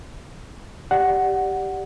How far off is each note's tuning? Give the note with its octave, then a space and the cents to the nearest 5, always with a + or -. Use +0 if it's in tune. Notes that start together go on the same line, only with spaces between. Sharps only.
G4 +0 D5 +0 F#5 +0